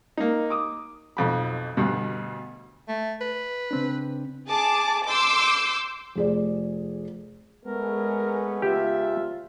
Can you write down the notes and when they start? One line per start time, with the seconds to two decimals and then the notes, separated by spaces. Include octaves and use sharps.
0.17 A#3 D#4
0.50 D6 D#6
1.17 B1 F2 B5
1.77 D2 G2 B2
2.89 A3
3.21 B4
3.71 C#3 C4 D4
4.48 G#4 A5 D6
5.08 C6 D6 E6 G6
6.15 F1 G#4 D5
7.65 G#3 A3 B3 C#4 A#4
8.62 C#2 F4 G4 E5